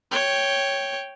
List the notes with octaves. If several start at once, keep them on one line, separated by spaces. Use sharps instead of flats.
C#5 G5